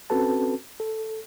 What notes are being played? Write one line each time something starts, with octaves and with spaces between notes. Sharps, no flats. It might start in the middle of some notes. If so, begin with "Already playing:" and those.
C4 C#4 F#4 A4 B4 A5
A4